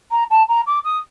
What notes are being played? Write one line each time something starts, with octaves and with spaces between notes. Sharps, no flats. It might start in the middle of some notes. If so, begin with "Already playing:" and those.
A#5
A5
A#5
D6
D#6